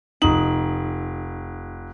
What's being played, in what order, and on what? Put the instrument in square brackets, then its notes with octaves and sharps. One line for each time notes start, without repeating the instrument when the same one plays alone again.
[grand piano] F1 F#7 [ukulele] D#4